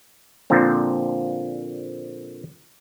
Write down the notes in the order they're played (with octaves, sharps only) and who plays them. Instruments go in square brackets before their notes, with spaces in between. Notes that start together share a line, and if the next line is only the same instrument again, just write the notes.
[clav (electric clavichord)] A#2 D3 F3 A#3 C4